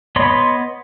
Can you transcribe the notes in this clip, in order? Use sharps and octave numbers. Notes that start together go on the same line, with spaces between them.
B3 C#5 D#5 B5 C6